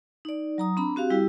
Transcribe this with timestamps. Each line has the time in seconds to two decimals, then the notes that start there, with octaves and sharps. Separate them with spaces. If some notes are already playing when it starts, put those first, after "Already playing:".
0.25 D#4 D5
0.58 F#3 A#5 D#6
0.77 C4 D4 A#5 B5
0.96 C4 F#4 G4 F5
1.10 G3 E4 G4